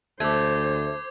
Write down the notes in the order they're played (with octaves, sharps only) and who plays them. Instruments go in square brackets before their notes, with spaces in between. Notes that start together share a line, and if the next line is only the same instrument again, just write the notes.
[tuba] D2 [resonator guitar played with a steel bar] A3 [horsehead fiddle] C5 [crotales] D6 G#6